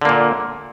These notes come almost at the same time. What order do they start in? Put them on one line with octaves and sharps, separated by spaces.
D3 A#3 A#2